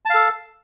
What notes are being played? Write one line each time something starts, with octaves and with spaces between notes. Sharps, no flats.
A4 F5 A5